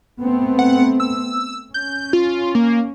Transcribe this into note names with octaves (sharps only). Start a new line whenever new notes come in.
A3 B3 C4
F#5
E6
C#4 G6
F4
A#3